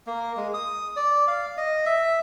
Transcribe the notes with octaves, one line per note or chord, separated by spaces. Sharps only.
A#3
G#3
D#6
D5
F5
D#5
E5